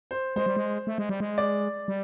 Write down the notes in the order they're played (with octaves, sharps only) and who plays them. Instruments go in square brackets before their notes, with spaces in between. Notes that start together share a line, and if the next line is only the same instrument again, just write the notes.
[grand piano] C5
[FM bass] G#3 [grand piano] C5
[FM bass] G3
G#3
A3
G#3
G3
G#3
[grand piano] D5
[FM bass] G3